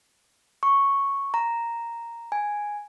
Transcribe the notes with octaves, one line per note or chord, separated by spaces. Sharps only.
C#6
A#5
G#5